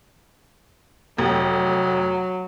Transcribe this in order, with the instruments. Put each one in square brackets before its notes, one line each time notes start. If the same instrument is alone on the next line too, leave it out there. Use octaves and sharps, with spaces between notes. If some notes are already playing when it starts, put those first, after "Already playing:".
[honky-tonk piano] F1 [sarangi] F#3